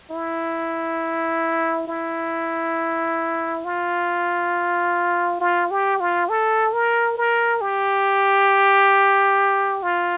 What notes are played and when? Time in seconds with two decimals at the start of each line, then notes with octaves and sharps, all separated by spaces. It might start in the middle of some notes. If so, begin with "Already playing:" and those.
0.11 E4
1.88 E4
3.65 F4
5.40 F4
5.71 G4
6.00 F4
6.29 A4
6.73 A#4
7.18 A#4
7.61 G4
9.83 F4